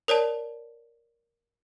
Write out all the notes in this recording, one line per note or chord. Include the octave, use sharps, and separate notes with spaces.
A#4 C#5 D5 A5